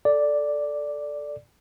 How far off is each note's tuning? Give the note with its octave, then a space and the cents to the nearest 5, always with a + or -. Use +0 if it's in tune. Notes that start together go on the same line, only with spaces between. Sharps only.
A4 +0 D5 +0